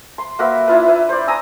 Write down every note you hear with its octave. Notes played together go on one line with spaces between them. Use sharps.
C6
A#3 F#4 B4 E5
D4 E4 F4 B4
E4 B4
C5 D5
G#5 A#5 D#6 E6